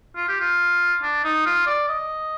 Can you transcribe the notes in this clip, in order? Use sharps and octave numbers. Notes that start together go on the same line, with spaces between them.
F4
G4
F4
D4
D#4
F4
D5
D#5